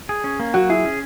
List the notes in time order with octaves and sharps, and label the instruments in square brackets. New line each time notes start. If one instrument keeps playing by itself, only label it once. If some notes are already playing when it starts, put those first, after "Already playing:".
[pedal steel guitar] G#4
C#4
A#3
[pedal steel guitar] F#3 [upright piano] F#4
[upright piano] E4 [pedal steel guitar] G#4
[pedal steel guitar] C#4